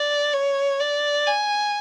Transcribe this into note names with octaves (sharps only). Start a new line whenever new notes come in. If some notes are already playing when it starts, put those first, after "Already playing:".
Already playing: D5
C#5
D5
G#5